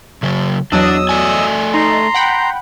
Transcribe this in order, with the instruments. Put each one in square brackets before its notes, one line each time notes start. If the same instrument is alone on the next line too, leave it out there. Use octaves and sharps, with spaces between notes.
[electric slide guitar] C#3 F#3
[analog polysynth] E2 F#3 D#5 [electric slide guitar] D4 [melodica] D#6 E6
[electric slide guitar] A3 D5 G#5
[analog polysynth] D#4 [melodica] A#5 C6
[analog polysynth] F#5 G5 B5